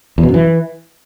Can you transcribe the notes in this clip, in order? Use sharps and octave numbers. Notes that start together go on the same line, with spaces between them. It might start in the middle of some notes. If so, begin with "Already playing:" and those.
E2
B2
F#2
E3